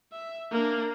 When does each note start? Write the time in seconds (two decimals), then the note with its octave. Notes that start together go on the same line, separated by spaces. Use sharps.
0.12 E5
0.52 A#3 D4